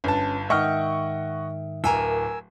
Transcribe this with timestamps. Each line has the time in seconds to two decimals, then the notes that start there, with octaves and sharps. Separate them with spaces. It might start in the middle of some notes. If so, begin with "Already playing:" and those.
0.04 G1 C#4 B4 A5
0.50 G#2 D#3 D#5 E5 F#5 G5 C#6 F6
1.84 D1 A#4 G#5 E6